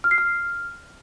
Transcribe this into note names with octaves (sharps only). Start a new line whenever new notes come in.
F6
C7
F6